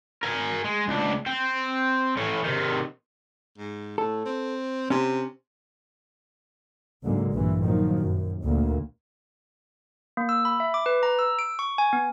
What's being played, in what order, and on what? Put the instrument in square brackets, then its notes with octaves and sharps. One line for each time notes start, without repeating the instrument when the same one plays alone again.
[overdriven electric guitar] A#4 G#5
G#3
C#2 D4
C4
A2 C#4
C3 D#3
[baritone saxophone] G#2
[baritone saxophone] A2 [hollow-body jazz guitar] A4
[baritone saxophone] C4
[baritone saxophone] C3 [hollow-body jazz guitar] C#4 C5
[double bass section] C#2 G#2 D3 F#3 G#3 A#3
A#1 G2 A#2 E3
A#2 D#3 F3 F#3
F#2
D2 A#2 A#3
[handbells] A#3
E6
B5
E5
D6
B4
A#5
E6
D7
C#6
G#5
B3